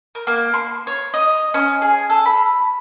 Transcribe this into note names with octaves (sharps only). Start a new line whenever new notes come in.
A#4
A#3
C6
C#5
D#5
C#4
G#4
A4
B5